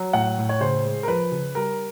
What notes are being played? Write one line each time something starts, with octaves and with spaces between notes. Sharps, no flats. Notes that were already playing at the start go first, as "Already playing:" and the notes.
Already playing: F#3
A2 F#5
A2
C#5
C#3 C5
G#3
A#4
F3 B4
C#3
G3 A#4